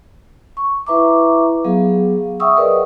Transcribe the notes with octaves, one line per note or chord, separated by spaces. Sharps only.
C#6
E4 B4 E5 A#5 C#6 D6
F#3 B3 G#4 F5
E5 F#5 G5 C#6 D#6 E6
G#4 A#4 B4 D5 D#5